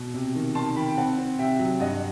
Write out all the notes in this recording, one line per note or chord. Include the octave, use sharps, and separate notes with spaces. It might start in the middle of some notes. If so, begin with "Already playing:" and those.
Already playing: B2
C3
D#3
D#3 A5 C6
D#3 G5 B5
G5
C4 F#5 A5
C4
C3 E5 G5
F#3
G2 D#5 F#5